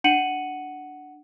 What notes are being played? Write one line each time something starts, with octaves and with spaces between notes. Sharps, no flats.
D4 F#5 C#7 D#7 F#7